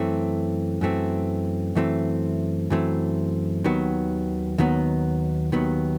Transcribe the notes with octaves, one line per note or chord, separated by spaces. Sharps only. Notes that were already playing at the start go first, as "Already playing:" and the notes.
Already playing: F#2 E3 A3 C4
F#2 E3 A3 C4
F#2 E3 A3 C4
F#2 E3 A3 C4
D#2 D#3 F#3 B3
D#2 D#3 F#3 B3
D#2 D#3 F#3 B3